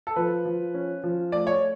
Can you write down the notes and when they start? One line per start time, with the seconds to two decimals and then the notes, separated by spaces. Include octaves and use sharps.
0.07 A4
0.16 F3 B4
0.45 F3
0.74 C#4
1.04 F3
1.32 A3 D5
1.47 C#5